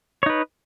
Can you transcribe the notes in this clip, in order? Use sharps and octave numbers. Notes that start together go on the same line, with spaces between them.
D#4 B4 C#5